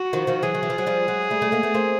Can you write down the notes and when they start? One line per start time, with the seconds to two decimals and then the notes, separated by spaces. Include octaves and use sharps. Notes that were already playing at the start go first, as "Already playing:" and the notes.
Already playing: F#4
0.13 D#3 F3
0.27 D#3 F3
0.43 E3 F#3 G#4
0.55 D#3
0.63 E3
0.70 F3
0.78 F#3
0.86 F3 G3
1.08 F#3 G#3
1.30 G3 A3
1.42 G3 A3
1.52 G#3 A#3
1.63 A3 B3
1.74 A#3 C4